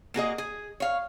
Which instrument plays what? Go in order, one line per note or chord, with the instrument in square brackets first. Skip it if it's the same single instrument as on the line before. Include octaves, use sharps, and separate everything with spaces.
[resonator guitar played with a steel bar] A#3 F#4 G#4 D#5
G#4
C#5 F5